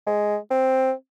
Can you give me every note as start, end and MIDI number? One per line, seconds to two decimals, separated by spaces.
0.07 0.37 56
0.50 0.92 60